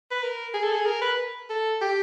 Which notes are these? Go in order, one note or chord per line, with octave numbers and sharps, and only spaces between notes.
B4
A#4
G#4
A4
G#4
A#4
B4
A4
G4